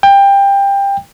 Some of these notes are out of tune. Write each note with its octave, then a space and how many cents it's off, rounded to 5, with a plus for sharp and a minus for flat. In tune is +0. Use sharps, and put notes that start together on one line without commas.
G5 +20